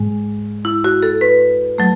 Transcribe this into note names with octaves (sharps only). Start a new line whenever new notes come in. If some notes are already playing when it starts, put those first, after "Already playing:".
Already playing: G#2 G#3
E4
F#4
A4
B4
F#3 A3